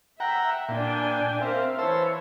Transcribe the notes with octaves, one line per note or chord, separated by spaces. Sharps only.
E5 F#5 G5 A#5
A#2 D4 G5 G#5
C4 A#4 E5 F5
E3 C5 C#5 A5 E6